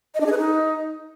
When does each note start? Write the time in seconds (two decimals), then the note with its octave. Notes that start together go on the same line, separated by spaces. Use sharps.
0.15 D#5
0.20 D4
0.26 G#4
0.32 B4
0.38 D#4